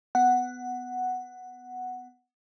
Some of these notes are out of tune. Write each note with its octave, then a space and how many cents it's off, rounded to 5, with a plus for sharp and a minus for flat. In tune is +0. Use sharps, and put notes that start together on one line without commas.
B3 +20 F#5 +0